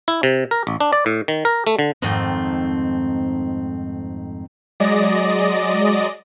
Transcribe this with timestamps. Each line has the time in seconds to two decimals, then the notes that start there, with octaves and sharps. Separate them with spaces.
0.08 E4
0.23 C3
0.51 A#4
0.67 A1
0.80 D4
0.93 D5
1.06 A2
1.28 D#3
1.45 A#4
1.67 A3
1.79 D3
2.02 F2 G#2 D#3 A3 C4
4.80 F#3 G#3 D5 D#5 A#6